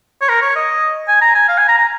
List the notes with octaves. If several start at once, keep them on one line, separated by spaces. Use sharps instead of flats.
C#5
A#4
C#5
D#5
G#5
A#5
G#5
F5
G#5
A#5
A#5